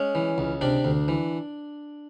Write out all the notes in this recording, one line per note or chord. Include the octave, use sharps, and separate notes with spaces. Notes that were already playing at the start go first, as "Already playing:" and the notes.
Already playing: G#3 C#4 C#5
E3
C#2
C3 D4 D5
D2
E3